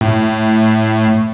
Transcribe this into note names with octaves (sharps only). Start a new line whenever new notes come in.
A2